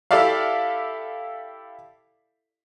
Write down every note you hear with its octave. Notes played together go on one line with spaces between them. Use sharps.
E4 G4 A4 D5 E5 F5